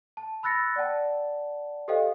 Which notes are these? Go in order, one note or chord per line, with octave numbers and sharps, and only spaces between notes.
A5
B5 E6 F#6 A6 A#6 C#7
D5 F#5 G5 A5
G4 A4 C5 D#5 F5 G5